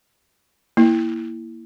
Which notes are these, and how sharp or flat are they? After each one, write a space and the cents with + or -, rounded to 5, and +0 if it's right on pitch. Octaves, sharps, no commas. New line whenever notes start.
A#3 +0 E4 +0